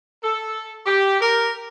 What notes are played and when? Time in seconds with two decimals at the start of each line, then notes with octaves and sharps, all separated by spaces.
0.23 A4
0.86 G4
1.21 A#4